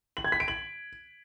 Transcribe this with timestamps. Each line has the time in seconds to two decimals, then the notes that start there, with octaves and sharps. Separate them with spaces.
0.17 F#7
0.24 G#6
0.32 B6
0.40 D7
0.48 F#7